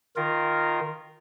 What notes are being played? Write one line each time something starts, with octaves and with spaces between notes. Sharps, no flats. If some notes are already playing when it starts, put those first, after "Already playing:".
D#3 F4 A#4